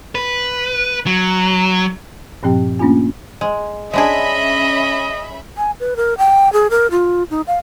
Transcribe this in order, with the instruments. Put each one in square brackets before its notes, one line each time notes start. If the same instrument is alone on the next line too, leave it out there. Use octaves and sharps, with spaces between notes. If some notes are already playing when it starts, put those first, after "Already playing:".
[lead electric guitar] B4
F#3
[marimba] G2 A#2 F3 C4 G4 G5
A3 A#3 C#4 D4 F4 G#5
[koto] G#3
[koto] G#3 D4 G#4 [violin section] C#4 E5 B5 [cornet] D#5
[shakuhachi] G#5
B4
A#4
G5
G#4
A#4
F4
D#4
F5